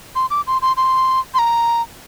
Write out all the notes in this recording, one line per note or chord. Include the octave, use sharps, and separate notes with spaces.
C6
D6
C6
C6
C6
C6
A#5